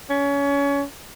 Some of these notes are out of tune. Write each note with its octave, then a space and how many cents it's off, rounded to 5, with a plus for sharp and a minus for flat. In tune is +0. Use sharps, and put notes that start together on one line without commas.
C#4 +25